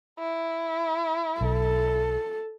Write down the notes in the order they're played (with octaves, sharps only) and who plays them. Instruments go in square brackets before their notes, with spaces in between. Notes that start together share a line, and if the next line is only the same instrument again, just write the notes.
[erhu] E4
[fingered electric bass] B1 [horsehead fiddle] A4